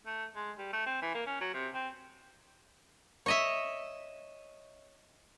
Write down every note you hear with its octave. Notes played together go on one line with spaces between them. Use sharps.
A3
G#3
G3
A3
C4
E3
A#3
C#4
F#3
C3
C4
C#5 D#5 E5